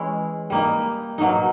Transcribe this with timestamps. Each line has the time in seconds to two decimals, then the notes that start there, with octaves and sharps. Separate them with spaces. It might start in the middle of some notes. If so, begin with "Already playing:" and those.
Already playing: E3 G#3 C#4 E4
0.50 G3 A#3 D#4
1.18 B2 F#3 A#3 D#4